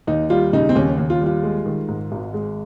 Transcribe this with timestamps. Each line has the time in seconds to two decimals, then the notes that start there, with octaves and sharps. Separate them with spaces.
0.07 D#2 D#4
0.30 G3 F4
0.53 C#3 D#4
0.69 C4
0.76 D#2 C#4
0.98 D#2
1.10 F4
1.21 G3
1.26 F4
1.43 G#3
1.66 D#3
1.88 G#2
2.12 G#1
2.34 G#3